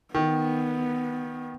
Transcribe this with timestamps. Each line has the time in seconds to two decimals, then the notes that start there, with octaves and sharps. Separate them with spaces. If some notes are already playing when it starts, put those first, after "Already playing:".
0.15 D#3 B3